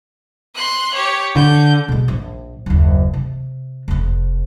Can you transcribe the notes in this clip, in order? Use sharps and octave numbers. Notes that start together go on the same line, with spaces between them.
C6 F#6
G4 C#5
D3 G6
B2 G#3
A#1
F#1 D#2
C3
F1 F2